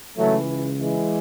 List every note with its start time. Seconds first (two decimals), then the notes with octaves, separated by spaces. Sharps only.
0.17 C#2 C#3 E3 F#3 A3
0.79 E3 G#3